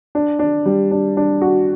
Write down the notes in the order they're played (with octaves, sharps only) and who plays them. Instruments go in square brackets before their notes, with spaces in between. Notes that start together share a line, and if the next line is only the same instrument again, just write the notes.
[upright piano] D4
D4
G3
D4
D4
F#4